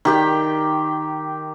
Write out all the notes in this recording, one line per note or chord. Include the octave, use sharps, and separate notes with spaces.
D#3 G4 G5